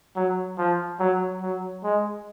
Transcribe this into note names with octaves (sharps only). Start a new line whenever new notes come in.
F#3
F3
F#3
F#3
G#3